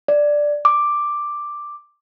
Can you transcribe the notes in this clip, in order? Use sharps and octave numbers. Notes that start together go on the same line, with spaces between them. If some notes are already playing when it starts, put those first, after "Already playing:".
D5
D6